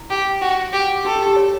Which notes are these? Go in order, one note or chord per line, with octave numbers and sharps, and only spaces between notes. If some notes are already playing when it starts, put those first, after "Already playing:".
Already playing: E4
G4
F#4
G4
F#4 A4
G4
G4
C#5